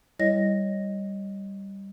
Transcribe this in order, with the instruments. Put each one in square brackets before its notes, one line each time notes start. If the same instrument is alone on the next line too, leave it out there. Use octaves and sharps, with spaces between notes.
[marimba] G3 E4 C#5 D#5 A#6